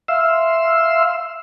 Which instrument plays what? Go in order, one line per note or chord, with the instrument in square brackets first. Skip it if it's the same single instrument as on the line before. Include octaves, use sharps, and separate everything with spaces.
[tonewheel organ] E5 F5 C6 E6